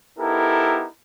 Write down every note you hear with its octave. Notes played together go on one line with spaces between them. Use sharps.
B3 D#4 E4 G4 A4 A#4